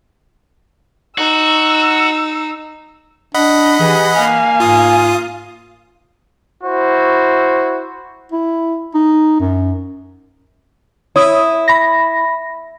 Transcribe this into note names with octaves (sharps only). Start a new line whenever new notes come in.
D#4 F#4 E6
D4 D#5 F#5 B5
E3 G4 G#4
A#3 F5 G#5
G#2 F4 D#6
E4 F#4 C5
E4
D#4
F#2
E4 C#5 D#6
B5 A#6